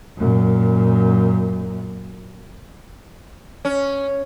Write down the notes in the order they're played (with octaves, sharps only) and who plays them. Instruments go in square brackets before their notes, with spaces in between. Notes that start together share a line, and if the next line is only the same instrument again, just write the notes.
[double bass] F#2 A#2
[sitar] C#4